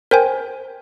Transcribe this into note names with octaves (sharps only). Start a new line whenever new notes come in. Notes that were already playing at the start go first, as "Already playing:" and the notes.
A#4 C5 G5 G#5